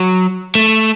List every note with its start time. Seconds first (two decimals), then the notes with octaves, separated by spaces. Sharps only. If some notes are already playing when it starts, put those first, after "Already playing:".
Already playing: F#3
0.55 A3